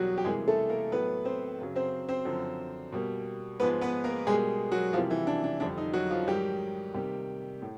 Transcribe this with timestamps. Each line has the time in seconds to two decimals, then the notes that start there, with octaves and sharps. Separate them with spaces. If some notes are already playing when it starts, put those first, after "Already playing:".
Already playing: E2 B2 F#3 G3 A#3 F#4
0.18 G4
0.24 C3 E3 G3 G#3 A#3 G#4
0.48 A3 A4
0.69 A#3 A#4
0.92 A2 F#3 A3 B3 B4
1.25 C4 C5
1.59 F#2 C#3 F#3
1.76 C4 C5
2.09 C4 C5
2.25 F#2 D3 F3
2.92 B2 G3 A#3
3.60 G#2 F3 G#3 B3 B4
3.81 B3 B4
4.04 A#3 A#4
4.26 B2 G3 G#3 A#3 G#4
4.72 F#3 F#4
4.93 C3 E3 F3 G3 A#3 F4
5.10 E3 E4
5.27 D4
5.44 D4
5.60 F2 D3 G3 D4
5.78 D#4
5.93 F#3 F#4
6.10 F3 F4
6.27 G#2 D#3 F#3 G3 G4
6.94 C3 D#3 G3 A#3
7.62 A2